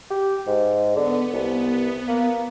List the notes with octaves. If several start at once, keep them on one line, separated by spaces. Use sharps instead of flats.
G4
G#2
D3 B3
C2
A#3